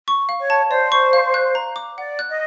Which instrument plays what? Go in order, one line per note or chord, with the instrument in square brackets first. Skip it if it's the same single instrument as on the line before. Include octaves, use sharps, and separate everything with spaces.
[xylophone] C#6
F5
[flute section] C#5
[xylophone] A5
[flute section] C5 [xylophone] D5
[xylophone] C#6
F5
F#6
A#5
D6
[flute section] D5 [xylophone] F#5
[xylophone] F#6
[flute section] D#5